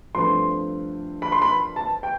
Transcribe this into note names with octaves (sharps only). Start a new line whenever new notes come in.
G2 F3 A3 C4 C6
B5
C6
B5
A5
G5